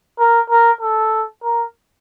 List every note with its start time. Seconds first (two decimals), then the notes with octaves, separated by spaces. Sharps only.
0.19 A#4
0.50 A#4
0.81 A4
1.44 A#4